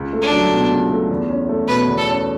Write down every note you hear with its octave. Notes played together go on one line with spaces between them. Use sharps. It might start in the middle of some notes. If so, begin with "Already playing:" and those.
Already playing: C#2
A3
D4
F#3
B2
C#2
A3
E2
C#4
A3
B2 B4
E2
A4
C#4